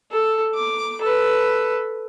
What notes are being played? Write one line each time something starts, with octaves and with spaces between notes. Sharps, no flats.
A4
D6
A4 B4